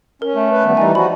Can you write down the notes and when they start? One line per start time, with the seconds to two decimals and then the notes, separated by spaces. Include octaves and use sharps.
0.22 C#4 A#4
0.36 A3
0.51 B4
0.64 D#3 G3 B3
0.77 E3 G3 D#4 D5 D#5 G#5
0.95 F3 F#4 B5